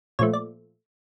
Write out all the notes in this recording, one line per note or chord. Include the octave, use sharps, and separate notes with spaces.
A#2 F3 A3 C#5
D5